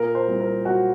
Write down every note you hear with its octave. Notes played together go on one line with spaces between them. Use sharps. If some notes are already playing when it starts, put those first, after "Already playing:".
Already playing: A#2 A#4
C5
C2
A#4
F#3 F#4